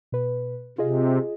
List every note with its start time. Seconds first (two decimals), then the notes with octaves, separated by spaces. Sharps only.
0.12 B2 B4
0.78 C3 F4 G#4 D#5